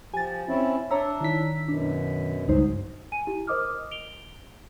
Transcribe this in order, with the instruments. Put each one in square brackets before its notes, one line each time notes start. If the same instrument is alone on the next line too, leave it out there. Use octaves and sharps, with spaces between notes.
[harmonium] F3 [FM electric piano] G4 [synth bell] G#5 A6
[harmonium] C4 C#4 E4
[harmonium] D4 [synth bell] C#5 A#5 E6 [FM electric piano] D5 E5
[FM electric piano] D#3 E4 B6
[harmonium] F#2 B2 [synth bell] D4
[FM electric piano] C#2 G2 [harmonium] F#3 [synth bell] G#3 D#4 C5
[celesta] G#5 D#7
E4 G4
A#4 C5 D#5 D6 D#6 F6
D7 F7 G7